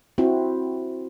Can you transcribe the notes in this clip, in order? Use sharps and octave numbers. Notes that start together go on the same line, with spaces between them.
C4 E4 F#4